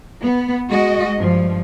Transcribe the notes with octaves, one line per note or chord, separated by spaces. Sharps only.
B3
G#3 F#4 D#5
G2 F3